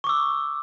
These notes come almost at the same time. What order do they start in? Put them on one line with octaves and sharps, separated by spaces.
C#6 D6 E6